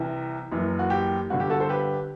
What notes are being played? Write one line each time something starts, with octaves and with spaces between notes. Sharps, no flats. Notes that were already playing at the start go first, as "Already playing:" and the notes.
Already playing: C2 C3 E3
F#1 F#2 E3
F#4
G4
G1 G2 D3 F#4
G4
F#4 A4
A4 C5
G4 B4